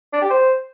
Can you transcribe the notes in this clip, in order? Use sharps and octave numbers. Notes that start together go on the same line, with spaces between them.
D4
G4
C5